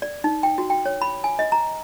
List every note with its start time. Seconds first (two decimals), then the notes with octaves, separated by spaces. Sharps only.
0.02 D5
0.24 D#4
0.43 G5
0.58 F#4
0.70 G5
0.86 C#5
1.02 B5
1.24 G#5
1.39 D#5
1.52 A#5